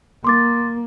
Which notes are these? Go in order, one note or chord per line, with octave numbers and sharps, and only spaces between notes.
A#3 C6 D6 A6